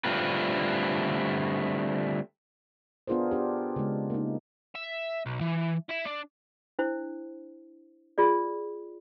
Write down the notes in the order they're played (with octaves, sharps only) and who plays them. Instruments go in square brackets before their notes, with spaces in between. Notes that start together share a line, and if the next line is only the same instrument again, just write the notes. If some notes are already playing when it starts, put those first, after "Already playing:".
[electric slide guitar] D3 G3 A3 C4 F4 B4
[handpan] B3 D4 F4 G#4 A#4 C5
D4 G4
C#3 G#3
A#3 D#4
[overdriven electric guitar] E5
B1
E3
E4 E5
D4
[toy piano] D4 E4 C5
F4 G#4 D5